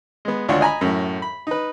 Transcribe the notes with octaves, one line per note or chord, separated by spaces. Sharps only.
G#3 B3
G#1 D2 D4 F4 C#5 F#5
D#5 G#5 A#5 B5
F#2 A2
B5
D#4 B4